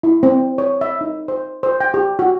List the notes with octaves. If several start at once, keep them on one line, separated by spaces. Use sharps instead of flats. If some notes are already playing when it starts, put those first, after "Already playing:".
E4
C4
C#5
E5
D#4
C5
C5
G5
G4
F#4